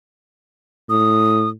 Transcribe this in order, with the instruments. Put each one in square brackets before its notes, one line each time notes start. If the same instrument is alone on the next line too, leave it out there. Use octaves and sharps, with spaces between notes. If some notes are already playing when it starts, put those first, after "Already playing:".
[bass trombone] A2 [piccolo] D#6